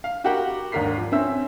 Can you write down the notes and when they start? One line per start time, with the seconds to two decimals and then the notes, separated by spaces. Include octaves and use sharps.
0.04 F5
0.24 E4 F#4 G4 A#4 F#5 G5
0.72 G#1 D#2 D4 A#4 B6 C7
0.98 F3
1.12 C4 C#4 E5 E6